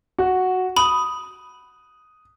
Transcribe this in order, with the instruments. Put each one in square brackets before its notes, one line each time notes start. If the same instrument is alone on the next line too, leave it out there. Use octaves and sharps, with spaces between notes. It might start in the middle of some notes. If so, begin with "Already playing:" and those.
[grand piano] F#4
[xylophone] B5 [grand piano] D#6